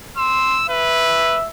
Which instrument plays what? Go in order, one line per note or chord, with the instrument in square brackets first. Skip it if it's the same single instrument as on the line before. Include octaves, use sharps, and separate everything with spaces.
[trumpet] C6 [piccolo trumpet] E6
[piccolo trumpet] B4 [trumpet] E5